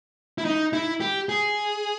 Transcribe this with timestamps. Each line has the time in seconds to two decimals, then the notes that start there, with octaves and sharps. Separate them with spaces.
0.38 E4
0.45 D#4
0.73 E4
1.00 G4
1.29 G#4